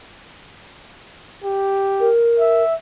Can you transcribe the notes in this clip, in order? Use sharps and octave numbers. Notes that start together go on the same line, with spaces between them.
G4
A#4
E5